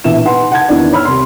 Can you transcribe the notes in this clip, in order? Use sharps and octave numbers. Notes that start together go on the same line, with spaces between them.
A#1 B2 E3 E5 E7
D#4 B4 F#5 G#5 C6
F#5 A5 G#6
E2 D#3 E3 D4 D#4 D5
C#5 B5 E6 F6
C2 C6